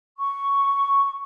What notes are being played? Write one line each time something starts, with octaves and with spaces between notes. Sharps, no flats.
C#6